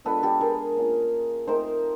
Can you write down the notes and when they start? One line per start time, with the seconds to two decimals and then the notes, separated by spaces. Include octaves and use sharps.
0.05 G#3 B3 D4 F4 A4 B4
0.23 G4 A4
0.41 G#4 A#4
0.77 A#3 C#4 F4
1.47 A3 C4 D#4 A#4 C5